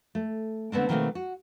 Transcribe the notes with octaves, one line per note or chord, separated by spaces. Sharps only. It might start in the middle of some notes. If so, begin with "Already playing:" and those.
A3
D3 A3 B3 C4 D4
B2 D#3 G3 A3 A#3 C4
F#4